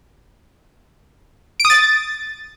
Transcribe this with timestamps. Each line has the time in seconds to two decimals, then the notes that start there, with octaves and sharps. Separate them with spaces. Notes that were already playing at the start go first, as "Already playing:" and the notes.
1.60 D7
1.65 D#6
1.70 A6